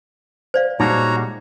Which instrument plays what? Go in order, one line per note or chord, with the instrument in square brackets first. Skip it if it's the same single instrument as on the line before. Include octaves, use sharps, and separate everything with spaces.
[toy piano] C5 D5 F5
[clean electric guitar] A#2 G3 G#3 [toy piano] D#4 [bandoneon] F#4 C#5 A#5